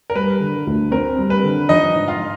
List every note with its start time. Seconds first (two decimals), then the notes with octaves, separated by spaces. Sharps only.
0.10 A#4
0.15 G3 B4
0.40 D3
0.67 D2
0.91 C4 A#4
1.18 G3
1.30 B4
1.43 D3
1.69 F3 D#4 D#5
1.95 G#2
2.08 F4 F5